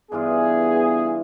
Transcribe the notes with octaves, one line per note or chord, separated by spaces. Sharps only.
G2 E3 B3 F4 G#4